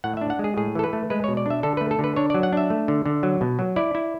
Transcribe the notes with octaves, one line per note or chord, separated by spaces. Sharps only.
A2 F#5
E5
D4
F#5
G#3
G#4
A2 G#4
E3 A4
B4
A3
G#3 B4
C#5
B2
D5
D4 E5
D3 A4
A3 B4
A4
D3 B4
D4 C#5
D5
F#3
F#5
D4 E5
A3
D3
D3
F#3
B2
F#3
E4 D5
E4